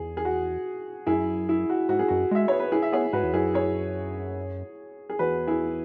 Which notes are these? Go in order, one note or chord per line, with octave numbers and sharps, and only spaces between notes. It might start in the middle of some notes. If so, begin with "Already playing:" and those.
Already playing: E2 G#4
G#4
F#4
F#2 E4 G#4
E4
F#4
G#2 F#4
G#4
F#2 F#4
G#3 E5
B3 C#5
B4
E4 G#4
E5
B3 G#4 C#5
G#2 F#4 B4
E2
F#2 E4 G#4
G#4 C#5
G#4
E2 F#4 B4
E4 G#4